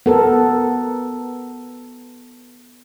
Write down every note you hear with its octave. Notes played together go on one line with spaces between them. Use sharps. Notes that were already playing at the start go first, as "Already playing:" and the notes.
B3 A4 A#4